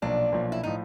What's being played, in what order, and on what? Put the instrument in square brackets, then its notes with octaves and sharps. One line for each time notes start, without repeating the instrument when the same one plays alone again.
[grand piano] B1 A#2 F3 [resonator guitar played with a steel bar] D4
[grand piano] B1 A#2 F3
[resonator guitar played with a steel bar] E4
[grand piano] A2 F3 [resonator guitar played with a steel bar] D#4